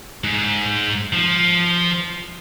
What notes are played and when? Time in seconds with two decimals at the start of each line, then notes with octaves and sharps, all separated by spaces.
0.24 G#2
1.13 F3